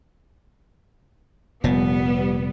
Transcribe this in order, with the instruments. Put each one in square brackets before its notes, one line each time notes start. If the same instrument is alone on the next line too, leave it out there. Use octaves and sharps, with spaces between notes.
[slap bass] F1 A#2 [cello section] G3 B3